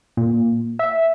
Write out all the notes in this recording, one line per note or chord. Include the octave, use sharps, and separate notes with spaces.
A#2
E5